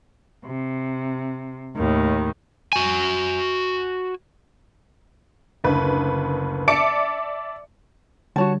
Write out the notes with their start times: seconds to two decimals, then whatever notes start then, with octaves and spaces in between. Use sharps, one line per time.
0.44 C3
1.75 D#2 A2 D#3
2.73 F#4 G#5
5.64 F#1 D2 B4
6.68 D5 E5 A5 D6 C#7 D7
8.36 D3 G3 F#4 C#5 A5